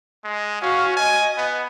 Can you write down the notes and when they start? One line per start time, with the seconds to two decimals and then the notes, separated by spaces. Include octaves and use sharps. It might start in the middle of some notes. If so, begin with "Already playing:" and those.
0.24 G#3
0.62 C#4 F#4 F5
0.97 D#5 G#5
1.38 B3